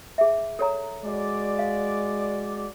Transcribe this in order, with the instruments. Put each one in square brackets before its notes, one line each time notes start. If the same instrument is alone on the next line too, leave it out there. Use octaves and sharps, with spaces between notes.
[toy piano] G#4 E5
A4 C#5 A#5
[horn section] G#3 F#4 D5
[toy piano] F5